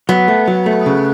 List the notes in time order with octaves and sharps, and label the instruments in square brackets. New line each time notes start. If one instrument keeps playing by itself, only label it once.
[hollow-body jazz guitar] F#3 [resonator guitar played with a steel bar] B3
[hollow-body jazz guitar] A3
F#3
A3
C#3